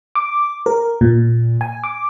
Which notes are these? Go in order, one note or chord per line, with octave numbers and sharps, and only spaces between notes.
D6
A#4
A#2
G#5
D6